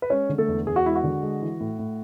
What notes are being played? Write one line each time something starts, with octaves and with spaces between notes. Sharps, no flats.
B4
G#3 C#4 C#5
D3
A3 A4
E2
E2 G#4
F#4
G#3 E4
F#4
D3
G#3
E3
A2
A2